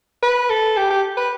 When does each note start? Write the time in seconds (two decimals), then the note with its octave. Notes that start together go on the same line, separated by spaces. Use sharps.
0.22 B4
0.49 A4
0.77 G4
0.90 G4
1.17 B4